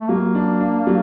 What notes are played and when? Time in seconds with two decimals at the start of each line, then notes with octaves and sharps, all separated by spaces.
0.01 A3
0.08 F#3 A#3
0.35 D4
0.60 D4
0.87 F#3